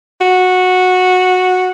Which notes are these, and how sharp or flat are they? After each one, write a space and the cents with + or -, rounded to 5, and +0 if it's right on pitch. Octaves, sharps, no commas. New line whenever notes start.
F#4 -10